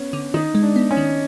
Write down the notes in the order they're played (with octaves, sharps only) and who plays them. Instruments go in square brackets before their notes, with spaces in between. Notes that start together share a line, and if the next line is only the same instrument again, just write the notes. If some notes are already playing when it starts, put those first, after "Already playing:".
Already playing: [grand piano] B3 C#4
[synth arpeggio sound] D3
[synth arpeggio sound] D#3 [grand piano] D#4
[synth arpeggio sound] G#3
[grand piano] D4
[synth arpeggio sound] B3
[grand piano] C#4
[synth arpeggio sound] D#3